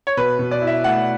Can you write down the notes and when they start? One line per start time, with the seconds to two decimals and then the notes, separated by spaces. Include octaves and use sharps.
0.07 C#5
0.17 B2 B4
0.39 B2
0.51 D5
0.61 E4
0.67 E5
0.84 A3 F#5